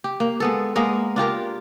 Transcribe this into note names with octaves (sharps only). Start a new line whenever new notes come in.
G4
A#3
G#3 B3 A4
G#3 A#3 B3 A#4
D4 F4 G4 A#4